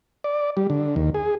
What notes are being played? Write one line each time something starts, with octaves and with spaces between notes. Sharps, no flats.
D5
G3
D3
D#2
G#4